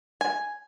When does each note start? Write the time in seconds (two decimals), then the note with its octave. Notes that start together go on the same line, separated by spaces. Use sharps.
0.21 G#5